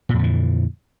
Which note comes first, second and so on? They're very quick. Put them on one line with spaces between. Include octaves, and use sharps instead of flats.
A#2 F2 D3 E3